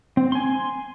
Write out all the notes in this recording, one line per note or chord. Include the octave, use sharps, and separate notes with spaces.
C4
G#5 C6